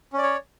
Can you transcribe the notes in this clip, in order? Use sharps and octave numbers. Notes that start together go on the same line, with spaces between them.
C#4 C#5 D5